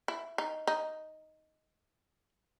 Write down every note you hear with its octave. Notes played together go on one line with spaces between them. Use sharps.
E4
D#4
D#4